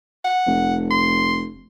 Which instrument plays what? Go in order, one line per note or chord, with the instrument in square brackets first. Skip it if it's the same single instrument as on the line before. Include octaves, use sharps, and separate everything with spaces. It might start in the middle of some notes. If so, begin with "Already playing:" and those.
[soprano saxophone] F#5
[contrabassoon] F1
[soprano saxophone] C6